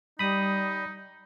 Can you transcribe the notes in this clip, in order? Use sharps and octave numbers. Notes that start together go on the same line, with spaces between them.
G3 D#4 B5 D#6